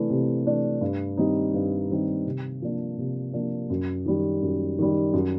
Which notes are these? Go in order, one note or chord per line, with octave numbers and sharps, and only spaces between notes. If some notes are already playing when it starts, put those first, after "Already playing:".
Already playing: C3 E3 A3 D4
C3
E3 A3 D4
G2
D#3 G3 C4 D#4
G2
D#3 G3 C4 D#4
C3
F3 A#3 D4
C3
F3 A#3 D4
F#2
D#3 G3
F#2
D#3 G3
F#2